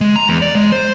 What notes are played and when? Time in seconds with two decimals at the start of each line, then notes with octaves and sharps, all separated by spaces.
0.01 G#3
0.16 A#5
0.29 E2
0.42 D5
0.55 G#3
0.72 C5